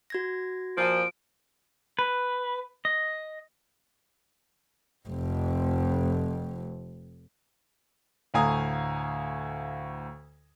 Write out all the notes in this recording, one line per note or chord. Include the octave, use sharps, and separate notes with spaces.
F#4 G#6 A#6
A#2 F3 D7
B4
D#5
F1 F2
D2 A2 F5 G#5 A#5 D#6